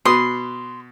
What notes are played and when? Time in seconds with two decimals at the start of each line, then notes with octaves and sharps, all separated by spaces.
0.05 B2 B4 C6 D#6